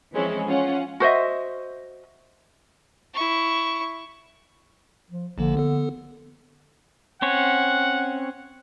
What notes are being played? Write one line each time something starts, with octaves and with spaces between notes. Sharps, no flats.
E3 F3 G#3 C4 C#4 E4
C#4 F4 F#5
F#4 C5 D#5 E5
E4 C#6
F3
A1 D3 F3 A#3
B3 A4
C4 C#4 C#5 F#5